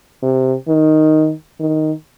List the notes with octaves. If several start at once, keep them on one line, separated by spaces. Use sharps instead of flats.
C3
D#3
D#3